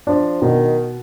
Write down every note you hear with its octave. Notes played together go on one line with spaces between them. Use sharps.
F3 D4
B2 D#3